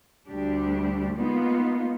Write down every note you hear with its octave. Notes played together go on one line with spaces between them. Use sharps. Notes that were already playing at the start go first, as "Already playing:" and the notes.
D2 G3 D4 G4
G#3 A#3 B3 D#4 F4